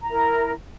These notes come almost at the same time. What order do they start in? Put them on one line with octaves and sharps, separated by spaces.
A#5 E4 A#4